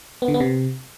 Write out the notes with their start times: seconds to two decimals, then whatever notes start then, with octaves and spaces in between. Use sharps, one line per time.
0.22 B3
0.28 D3
0.34 B3
0.40 C3